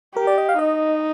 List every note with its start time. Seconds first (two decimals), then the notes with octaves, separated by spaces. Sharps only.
0.16 G4 A#4
0.27 D5
0.38 D#5
0.49 F5
0.59 D#4 D#5